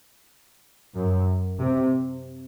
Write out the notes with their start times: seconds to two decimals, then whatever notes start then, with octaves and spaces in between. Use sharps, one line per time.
0.95 F#2
1.60 C3